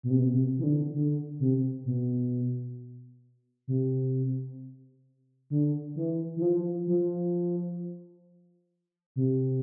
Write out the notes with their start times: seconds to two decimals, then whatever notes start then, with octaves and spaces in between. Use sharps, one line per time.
0.03 B2
0.10 C3
0.19 B2
0.33 C3
0.58 E3
0.64 D3
0.94 D3
1.40 C3
1.85 B2
3.68 C3
5.50 D3
5.96 E3
6.36 E3
6.42 F3
6.87 F3
9.16 C3